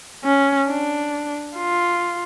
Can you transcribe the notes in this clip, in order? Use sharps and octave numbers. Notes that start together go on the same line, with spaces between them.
C#4
D4
F4